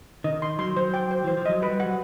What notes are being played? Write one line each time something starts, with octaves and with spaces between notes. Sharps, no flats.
D#3 D#5
C6
F#3 C6
F#3 C5
G5
C5
E3 C5
F3
F#3 D#5
G3 B4
F#3 F#5